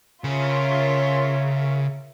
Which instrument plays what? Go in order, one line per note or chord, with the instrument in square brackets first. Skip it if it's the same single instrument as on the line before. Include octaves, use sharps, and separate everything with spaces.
[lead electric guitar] C#3 [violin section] F4 A#4 C#5 E5